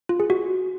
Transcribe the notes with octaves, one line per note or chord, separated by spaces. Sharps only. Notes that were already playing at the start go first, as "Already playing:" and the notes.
F4
G#4
F#4